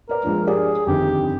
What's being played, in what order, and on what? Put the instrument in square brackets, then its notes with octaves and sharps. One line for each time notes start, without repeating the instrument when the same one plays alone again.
[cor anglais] A#4 [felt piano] B4 D5
[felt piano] G2 F3 G#3
[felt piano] G4 D5 [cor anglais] G#4
[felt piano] G1 F2 D#3 [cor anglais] G4